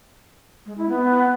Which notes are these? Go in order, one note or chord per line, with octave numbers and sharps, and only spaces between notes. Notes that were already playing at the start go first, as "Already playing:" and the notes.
G#3
E4
B3